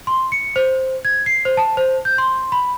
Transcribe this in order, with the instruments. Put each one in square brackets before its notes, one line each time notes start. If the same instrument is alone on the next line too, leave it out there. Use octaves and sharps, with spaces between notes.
[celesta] C6
C#7
C5
G#6
C7
C5
A5
C5
G6
C6
B5